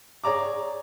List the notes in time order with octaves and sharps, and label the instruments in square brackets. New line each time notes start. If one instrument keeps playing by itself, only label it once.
[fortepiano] G#4 C#5 D5 A#5 D6